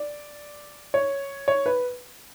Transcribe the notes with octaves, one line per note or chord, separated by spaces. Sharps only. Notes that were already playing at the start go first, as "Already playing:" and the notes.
Already playing: D5
C#5
C#5
B4